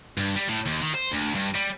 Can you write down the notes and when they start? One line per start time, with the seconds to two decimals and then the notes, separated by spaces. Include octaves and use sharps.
0.18 G2
0.36 G3
0.49 A2
0.66 D#2
0.81 D#3
0.94 C5
1.11 D2
1.35 G2
1.55 G3